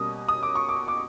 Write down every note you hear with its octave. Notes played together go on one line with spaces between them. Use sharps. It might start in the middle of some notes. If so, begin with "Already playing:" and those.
Already playing: B2 G3 A#3 C#4 D#6
D#6
D6
C#6
D6
D6